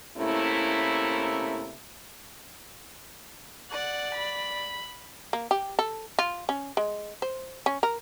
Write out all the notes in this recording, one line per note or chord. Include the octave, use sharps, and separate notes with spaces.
C3 A3 A#3 C#4 E4
D5 F#5
B5
A#3
G4
A4
F4
C#4
G#3
C5
C#4
A#4